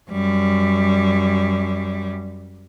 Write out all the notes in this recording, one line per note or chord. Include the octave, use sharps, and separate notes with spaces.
F#2 G3